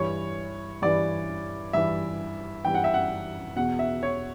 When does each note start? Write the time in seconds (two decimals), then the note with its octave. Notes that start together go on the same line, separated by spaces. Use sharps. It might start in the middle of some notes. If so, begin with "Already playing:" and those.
Already playing: G2 E3 C#5
0.82 G2 E3 D5
1.73 G2 E3 E5
2.65 G2 E3 G5
2.74 F#5
2.84 E5
2.94 F#5
3.56 E2 B2 F#5
3.79 E5
4.03 C#5